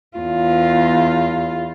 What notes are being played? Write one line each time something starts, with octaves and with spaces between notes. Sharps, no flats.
E2 F4